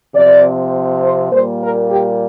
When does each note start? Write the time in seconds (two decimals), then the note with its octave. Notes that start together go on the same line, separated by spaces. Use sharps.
0.15 C3 F3 C4 D5
1.02 C5
1.32 A#2 G3 A#3 C5
1.62 A#4
1.90 G4